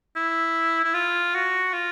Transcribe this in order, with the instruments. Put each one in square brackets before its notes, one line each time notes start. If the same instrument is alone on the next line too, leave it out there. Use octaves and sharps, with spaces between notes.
[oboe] E4
E4
F4
F#4
F4